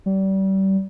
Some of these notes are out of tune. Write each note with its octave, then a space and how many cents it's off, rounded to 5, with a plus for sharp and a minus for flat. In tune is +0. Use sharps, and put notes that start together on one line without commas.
G3 -30